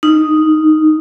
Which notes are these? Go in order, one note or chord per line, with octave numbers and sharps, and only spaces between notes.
D#4